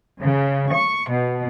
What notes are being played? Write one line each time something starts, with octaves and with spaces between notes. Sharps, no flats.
C#3
C#6
B2